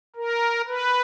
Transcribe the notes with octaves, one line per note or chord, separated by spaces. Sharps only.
A#4
B4